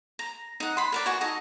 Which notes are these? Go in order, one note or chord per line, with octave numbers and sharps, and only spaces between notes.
A#5
D#4 F#5
B5 C6
A#4 B4 D5
F#4 G#5 C#6
D#4 A4 D#5